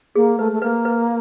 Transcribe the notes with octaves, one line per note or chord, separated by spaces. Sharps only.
A#3 G#4
A3 B4
A3
A#3 B4
B4